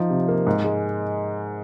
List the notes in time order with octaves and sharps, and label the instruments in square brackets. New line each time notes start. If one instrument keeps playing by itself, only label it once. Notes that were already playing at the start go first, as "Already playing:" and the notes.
Already playing: [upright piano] F3 D#4
C3
A#3
G#2
G#3